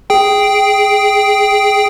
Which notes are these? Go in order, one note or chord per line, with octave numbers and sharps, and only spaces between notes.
G#4 G5